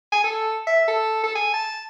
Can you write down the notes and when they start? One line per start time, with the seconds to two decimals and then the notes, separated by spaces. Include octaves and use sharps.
0.12 G#5
0.24 A4
0.67 E5
0.88 A4
1.23 A4
1.35 G#5
1.54 A5